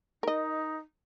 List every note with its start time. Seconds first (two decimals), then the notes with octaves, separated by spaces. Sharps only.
0.23 D#4 A#4 D#5